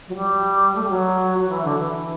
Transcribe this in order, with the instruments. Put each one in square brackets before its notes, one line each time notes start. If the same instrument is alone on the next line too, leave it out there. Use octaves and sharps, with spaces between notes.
[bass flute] F#3
G3
A3
G3
F#3
F#3
E3
D3
E3